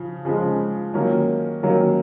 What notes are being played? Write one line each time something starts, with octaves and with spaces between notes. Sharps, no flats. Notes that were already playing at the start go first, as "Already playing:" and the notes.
Already playing: C#3 F3
C#3 F3 G#3
D#3 F#3 A#3 C#4
D#3 F#3 A#3 C#4